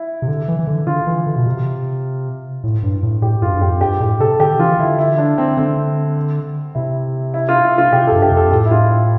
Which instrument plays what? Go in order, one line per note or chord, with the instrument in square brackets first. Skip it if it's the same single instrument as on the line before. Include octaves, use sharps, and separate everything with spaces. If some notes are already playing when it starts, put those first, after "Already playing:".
Already playing: [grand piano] E4
[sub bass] C3
D3
E3
E3
D3
[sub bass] D3 [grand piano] F4
[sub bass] E3
D3
B2
C3
A2
G2
A2
[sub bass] A2 [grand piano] G4
[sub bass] G2 [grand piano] F4
[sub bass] G2
[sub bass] F2 [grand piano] G4
[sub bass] G2 [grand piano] G4
[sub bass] A2 [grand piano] G4
[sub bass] C3 [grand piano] A4
[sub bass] D3 [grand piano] G4
[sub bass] E3 [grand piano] F4
[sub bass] D3 [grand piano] E4
[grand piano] E4
D4
C4
[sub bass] D3 [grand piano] C4
[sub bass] C3 [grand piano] E4
[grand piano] E4
F4
E4
F4
[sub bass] C3 [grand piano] G4
[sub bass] G2 [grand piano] A4
[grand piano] G4
[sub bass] F2
[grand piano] A4
[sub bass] A2 [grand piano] G4
[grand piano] E4
F4
E4